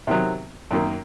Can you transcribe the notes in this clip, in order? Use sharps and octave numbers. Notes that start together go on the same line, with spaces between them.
C3 D#3 F#3
F#2 D#3 A#3